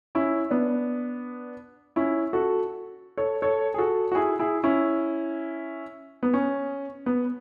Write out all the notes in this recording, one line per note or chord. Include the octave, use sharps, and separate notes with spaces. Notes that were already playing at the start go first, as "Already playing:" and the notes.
C#4 E4
B3 D4
C#4 E4
F#4 A4
A4 C#5
A4 C#5
G#4
F#4 A4
F#4
E4 G#4
E4 G#4
C#4 E4
B3
C#4
B3